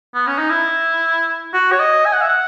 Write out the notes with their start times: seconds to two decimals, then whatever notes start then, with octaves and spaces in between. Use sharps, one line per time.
0.14 B3
0.27 C#4
0.38 D#4
0.50 E4
1.53 F#4
1.72 C#5
1.79 D#5
2.05 G#5
2.13 F#5
2.21 E5
2.29 F#5